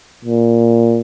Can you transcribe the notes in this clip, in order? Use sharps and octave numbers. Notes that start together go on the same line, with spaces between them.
A#2